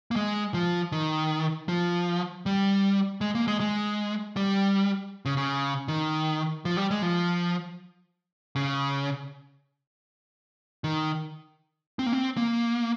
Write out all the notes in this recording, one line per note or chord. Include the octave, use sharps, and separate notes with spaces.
A#3
G#3
F3
D#3
F3
G3
G#3
A#3
G#3
G#3
G3
C#3
C#3
D#3
F3
G3
G#3
F3
C#3
D#3
C4
A#3
C4
A#3